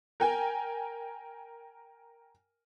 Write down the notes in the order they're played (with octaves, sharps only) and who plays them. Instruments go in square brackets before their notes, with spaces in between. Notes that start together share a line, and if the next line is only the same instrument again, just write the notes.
[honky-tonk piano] A#4 G5 G#5